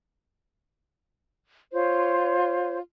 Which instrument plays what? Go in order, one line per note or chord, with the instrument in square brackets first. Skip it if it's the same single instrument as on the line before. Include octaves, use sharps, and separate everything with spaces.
[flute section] F4 C5 C#5